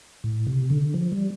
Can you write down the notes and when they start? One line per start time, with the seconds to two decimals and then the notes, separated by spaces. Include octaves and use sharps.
0.24 A2
0.47 C3
0.70 D3
0.94 F3
1.12 G3